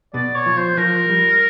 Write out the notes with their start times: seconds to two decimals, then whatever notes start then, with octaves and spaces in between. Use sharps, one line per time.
0.14 B2 D5
0.35 C#5
0.46 F3
0.57 C5
0.77 F3 A#4
1.09 G3